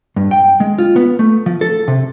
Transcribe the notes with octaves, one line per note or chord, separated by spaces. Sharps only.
G2
G5
G#3
F4
B3
A3
F3
A4
C3